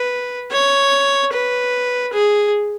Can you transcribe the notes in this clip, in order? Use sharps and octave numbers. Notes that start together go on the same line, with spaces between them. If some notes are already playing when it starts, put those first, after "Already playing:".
Already playing: B4
C#5
B4
G#4